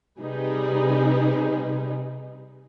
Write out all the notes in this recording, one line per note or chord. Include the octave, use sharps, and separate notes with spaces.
C3 G3 D#4 G#4 B4